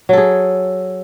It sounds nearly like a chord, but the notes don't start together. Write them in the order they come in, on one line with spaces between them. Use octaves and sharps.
F#3 A4 G#4